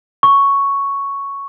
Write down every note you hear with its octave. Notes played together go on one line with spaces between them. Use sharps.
C#6